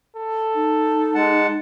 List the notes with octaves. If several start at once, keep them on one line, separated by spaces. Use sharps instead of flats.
A4
D#4
G#3 F#5 A5